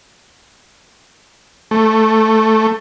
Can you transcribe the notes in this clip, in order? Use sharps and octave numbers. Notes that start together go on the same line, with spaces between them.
A3